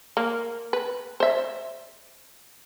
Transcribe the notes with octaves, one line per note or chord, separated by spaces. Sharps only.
A#3
B4
C5 E5